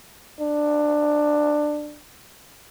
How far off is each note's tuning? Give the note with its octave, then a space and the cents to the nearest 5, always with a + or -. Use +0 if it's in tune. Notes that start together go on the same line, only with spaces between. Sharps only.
D4 +15